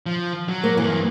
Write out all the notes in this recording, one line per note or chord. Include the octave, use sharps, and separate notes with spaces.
F3
F#3
A#3
G2 E3 A#3